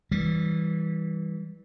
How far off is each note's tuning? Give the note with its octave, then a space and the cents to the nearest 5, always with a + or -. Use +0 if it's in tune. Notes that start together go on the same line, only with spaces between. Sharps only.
E3 -20 G3 +0